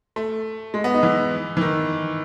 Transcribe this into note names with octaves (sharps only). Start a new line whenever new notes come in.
A3
G#3
B3
D#4
E3
E3
D#3